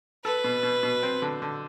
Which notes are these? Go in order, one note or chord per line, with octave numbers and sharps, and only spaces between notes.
A4 B4
B2
B2
B2
C4
D3
D3